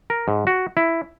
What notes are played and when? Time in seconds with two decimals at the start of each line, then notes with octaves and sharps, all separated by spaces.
0.10 A#4
0.28 G#2
0.47 F#4
0.77 E4